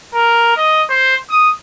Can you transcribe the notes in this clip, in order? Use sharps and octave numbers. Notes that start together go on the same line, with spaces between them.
A#4
D#5
C5
D#6